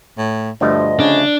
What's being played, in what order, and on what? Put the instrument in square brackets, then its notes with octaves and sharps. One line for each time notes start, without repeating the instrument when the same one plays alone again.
[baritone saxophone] A2
[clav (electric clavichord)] D2 F3 A3 [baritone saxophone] G2 [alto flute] D#5
[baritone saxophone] C#3 [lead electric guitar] D4